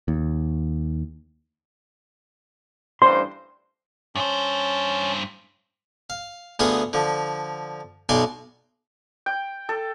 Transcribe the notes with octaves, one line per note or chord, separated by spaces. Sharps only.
D#2
A1 G2 C5 C6
G2 C#4 C5 A5
F5
D2 B3 F4 G#4 D#6
D3 F3
B1 B2 D5 G#5 C6
G5
A4